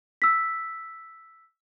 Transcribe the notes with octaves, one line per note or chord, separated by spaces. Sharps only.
E6 B6